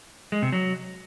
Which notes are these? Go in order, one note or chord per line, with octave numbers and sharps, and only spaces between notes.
G#3
C3
F#3